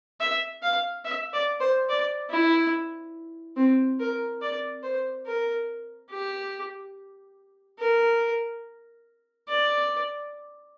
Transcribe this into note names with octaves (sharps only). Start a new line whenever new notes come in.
E5
F5
E5
D5
C5
D5
E4
C4
A#4
D5
C5
A#4
G4
A#4
D5